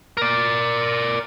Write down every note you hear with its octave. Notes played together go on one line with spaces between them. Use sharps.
A#4 D5